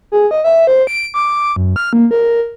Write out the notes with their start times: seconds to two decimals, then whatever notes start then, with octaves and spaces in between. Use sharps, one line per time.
0.12 G#4
0.31 D#5
0.44 E5
0.67 C5
0.87 D7
1.14 D6
1.56 F#2
1.76 F6
1.93 A#3
2.11 A#4